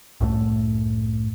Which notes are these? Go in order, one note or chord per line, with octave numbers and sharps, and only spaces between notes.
C2 F#2 A2 A3